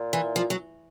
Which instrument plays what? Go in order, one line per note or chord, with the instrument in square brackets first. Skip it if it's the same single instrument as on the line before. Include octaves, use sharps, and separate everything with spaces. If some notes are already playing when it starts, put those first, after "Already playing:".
Already playing: [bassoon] A#2
[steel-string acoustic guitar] E3
F3
F#3